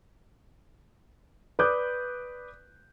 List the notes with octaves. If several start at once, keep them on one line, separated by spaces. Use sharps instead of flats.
B4 D5 D6 D#6 F#6 G6